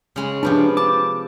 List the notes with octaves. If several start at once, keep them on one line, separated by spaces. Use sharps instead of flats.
C#3 G#3
C3 F3 D4 B4
A5 D6